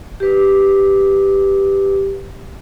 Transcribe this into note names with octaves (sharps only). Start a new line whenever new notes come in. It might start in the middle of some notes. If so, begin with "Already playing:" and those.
G4 B4